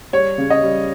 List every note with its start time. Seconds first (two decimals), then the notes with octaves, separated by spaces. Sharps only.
0.13 G3 C#5
0.38 C#3
0.50 D#5
0.63 G3